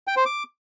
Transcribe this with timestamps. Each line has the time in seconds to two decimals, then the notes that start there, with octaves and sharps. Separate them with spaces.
0.08 G5
0.17 C5
0.26 D6